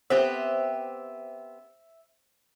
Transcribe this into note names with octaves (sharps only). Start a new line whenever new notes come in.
B3 C4 G4 C5 E5